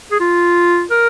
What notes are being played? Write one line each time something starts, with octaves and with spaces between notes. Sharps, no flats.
G#4
F4
A#4